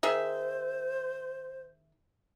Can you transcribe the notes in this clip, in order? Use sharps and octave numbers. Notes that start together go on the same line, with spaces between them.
D#3 G#4 C5 E5